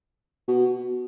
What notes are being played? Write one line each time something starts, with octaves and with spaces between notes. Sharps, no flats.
B2